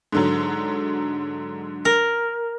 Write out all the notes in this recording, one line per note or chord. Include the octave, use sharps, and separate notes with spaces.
G#2 D3 F#3
A#4